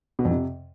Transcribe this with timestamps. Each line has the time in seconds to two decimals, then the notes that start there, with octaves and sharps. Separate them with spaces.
0.19 B2
0.25 F2
0.31 C3